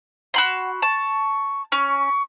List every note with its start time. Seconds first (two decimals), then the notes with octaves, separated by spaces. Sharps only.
0.34 F#4 F#5 B5 C6
0.82 A5 C#6
1.72 C#4 C#6